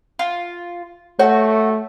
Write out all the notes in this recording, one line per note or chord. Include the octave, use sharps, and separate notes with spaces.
F4
A3 F#4 C#5